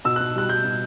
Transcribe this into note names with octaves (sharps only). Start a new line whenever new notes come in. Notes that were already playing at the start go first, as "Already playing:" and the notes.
B2 E6
F#6
B2
G3 F#6
G3 G6
B2